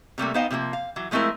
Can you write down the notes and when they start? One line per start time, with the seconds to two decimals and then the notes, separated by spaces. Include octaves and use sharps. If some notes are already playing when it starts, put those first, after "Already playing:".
0.18 C3 G3 A3 A#3
0.34 B3 D#4 C5 D#5 F5 G5
0.50 C3 F3 G#3 A#3
0.73 F5
0.96 E3 F#3
1.11 F3 G#3 A3 C4 E4 A#4